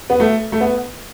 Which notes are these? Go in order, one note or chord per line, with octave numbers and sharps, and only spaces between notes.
B3
A3
A3
B3